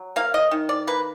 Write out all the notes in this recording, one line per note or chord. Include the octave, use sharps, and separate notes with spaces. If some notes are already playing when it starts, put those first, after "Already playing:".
Already playing: F#3
A#3 F5
D#5
D#3
D5
A#3 B4